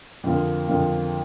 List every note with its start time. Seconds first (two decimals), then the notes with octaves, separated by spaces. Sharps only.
0.24 F2 D3 F3 A#3
0.68 F2 D3 F3 A#3